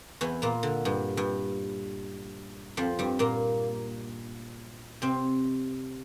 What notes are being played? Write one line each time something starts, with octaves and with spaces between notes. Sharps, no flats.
E2 E3
A#2 A#3
D3
G2
G2
F2 F3
G2 G3
A#2 A#3
C3 C4